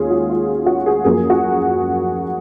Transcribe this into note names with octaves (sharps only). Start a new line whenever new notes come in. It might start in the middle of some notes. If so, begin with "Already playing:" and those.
Already playing: D#2 D#3 G#3 C#4 F4 G#4
F#4
F4
F#4
G#4
F#2 F3 A#3 G#4
F#4